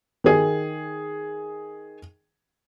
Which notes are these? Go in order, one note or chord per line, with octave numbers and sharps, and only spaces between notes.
D#3 G#4